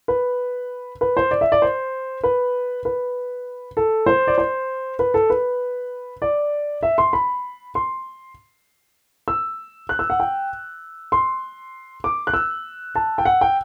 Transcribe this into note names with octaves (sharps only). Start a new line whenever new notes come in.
B4
B4
C5
D5
E5
D5
C5
B4
B4
A4
C5
D5
C5
B4
A4
B4
D5
E5
C6
B5
C6
E6
F#6
E6
F#5
G5
C6
D6
F#6
E6
A5
G5
F#5
G5